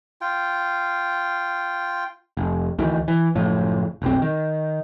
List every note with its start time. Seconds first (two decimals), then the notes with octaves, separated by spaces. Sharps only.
0.21 F4 G5
2.37 F1
2.79 D2 D#3 E3
3.08 E3
3.35 F#1 A2 F3
4.02 F1 B1 C4
4.22 D#3